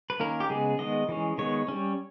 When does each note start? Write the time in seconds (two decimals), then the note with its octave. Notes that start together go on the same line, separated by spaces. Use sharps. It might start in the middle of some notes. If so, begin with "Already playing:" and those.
0.10 B4
0.20 D#3 A#3 C#4 A#4
0.40 G4
0.50 C#3 G#3 B3 G#4
0.79 D#3 G#3 B3 D#5
1.09 E3 G#3 C#4
1.38 D#3 G#3 B3 C#5
1.68 G3 C#4